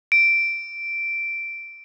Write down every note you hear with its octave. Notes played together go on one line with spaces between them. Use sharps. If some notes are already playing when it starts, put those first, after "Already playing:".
D7